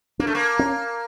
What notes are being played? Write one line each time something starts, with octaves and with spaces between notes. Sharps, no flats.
A#3 D4
A3
A#3
C#4